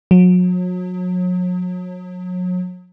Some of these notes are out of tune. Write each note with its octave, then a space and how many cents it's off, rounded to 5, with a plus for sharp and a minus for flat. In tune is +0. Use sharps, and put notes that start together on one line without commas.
F#3 -35